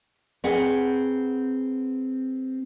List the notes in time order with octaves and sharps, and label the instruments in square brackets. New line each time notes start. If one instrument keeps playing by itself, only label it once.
[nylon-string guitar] C4 G#4 B4 F#5